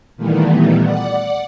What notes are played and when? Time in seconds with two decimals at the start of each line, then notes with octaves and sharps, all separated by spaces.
0.17 A#2 D#3 E3 G3 A3 B3
0.83 D5 F#5